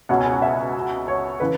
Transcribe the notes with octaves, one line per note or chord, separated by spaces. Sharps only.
C#2 B2 B3 F#4 C#5 F#5
G#5
F#5
E5
C#5
C#3 E3 B4